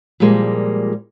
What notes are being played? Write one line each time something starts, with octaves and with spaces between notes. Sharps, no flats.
A#2 F3 G3 G#3 A#3